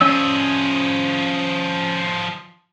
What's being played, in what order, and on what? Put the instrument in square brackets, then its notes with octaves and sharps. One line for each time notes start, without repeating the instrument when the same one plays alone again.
[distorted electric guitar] F3 G#4 [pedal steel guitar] C#4 D5 E6